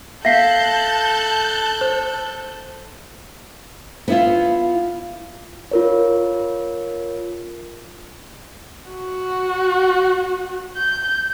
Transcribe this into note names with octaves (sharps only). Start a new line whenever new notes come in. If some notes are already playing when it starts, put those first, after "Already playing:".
A4 E5 F5 A5 F#6 G6 A#6 C7
C5
B3 E4 F4
F4 A#4 C#5
F#4
G6